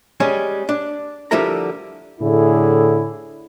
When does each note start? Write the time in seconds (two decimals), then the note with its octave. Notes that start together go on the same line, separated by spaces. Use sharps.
0.20 G3 G#3 C#4
0.69 D4
1.31 D3 F3 G3 E4 A#4 A#5
2.20 A2 D3 E4 G#4